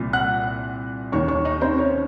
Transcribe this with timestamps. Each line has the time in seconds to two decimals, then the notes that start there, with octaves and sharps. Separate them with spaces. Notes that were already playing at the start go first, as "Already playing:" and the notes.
Already playing: C2 A#2
0.13 F#5 F#6
1.12 D#2 D#3 C#5 C#6
1.28 C#5 C#6
1.45 D#4 D#5
1.61 C4 C5
1.78 C#4 C#5